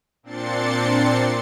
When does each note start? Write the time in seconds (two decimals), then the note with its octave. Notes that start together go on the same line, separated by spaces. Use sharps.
0.23 A#2 C4 D4 C6 A6 C#7